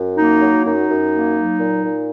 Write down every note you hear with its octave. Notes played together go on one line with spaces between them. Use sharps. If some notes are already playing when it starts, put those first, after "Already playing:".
Already playing: F#2
A#3 D#4
F#3
F#2 D#4
F#2
A#3
F#3
A#2
A#2